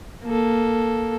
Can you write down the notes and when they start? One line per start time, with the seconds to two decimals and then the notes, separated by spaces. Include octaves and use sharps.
0.25 A#3 A4